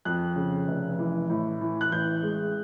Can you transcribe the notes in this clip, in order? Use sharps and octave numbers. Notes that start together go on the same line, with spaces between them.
F2 F#6
C#3
F1
E3
A2
E3
F#6
A1 G6
G#3